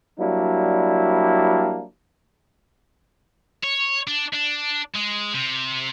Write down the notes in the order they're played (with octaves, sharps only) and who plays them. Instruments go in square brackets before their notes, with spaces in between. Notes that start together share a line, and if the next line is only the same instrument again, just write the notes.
[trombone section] F#3 G3 A#3 D4 E4
[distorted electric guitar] C#5
D4
D4
G#3
C3